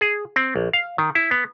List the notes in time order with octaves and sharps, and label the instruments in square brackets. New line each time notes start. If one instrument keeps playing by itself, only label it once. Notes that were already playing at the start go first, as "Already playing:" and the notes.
[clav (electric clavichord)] G#4
C4
A#1
F5
D#3
E4
B3